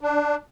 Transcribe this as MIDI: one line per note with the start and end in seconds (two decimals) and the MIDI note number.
0.01 0.35 62